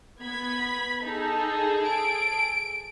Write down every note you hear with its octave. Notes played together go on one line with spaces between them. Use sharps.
B3 B5 G#6
D#4 G#4 A4
D7